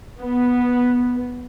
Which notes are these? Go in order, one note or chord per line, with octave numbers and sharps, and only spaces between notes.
B3